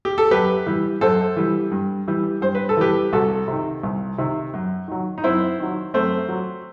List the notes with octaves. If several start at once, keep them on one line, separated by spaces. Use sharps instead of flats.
G4
A4
F#2 G4 B4
E3 G3
F#2 A4 C5
E3 G3
G2
E3 G3
G2 C5
B4
A4
E3 G3 G4 B4
C2 F#4 A4
C3 D#3
C2
C3 D#3
F#2
D#3 F#3
D#4
F#2 C4 E4
D#3 F#3
F#2 A3 C4
F#3